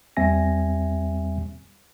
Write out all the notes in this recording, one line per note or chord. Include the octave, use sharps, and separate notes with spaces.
E2 G3 C4 E5 G#5 A#6